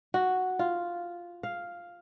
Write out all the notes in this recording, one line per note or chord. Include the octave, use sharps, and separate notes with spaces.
F#4
F4
F5